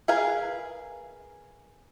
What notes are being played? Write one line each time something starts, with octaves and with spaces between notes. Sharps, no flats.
G#4 A#4 B4 F5 G#5